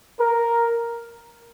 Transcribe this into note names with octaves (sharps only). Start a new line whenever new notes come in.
A#4